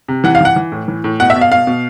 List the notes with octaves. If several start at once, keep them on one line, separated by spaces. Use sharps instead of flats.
C3
E3 F#5
F5
E3 F#5
E3
A2
E3
A2
B2 F#5
E5
B2
F5
B2 F5
B2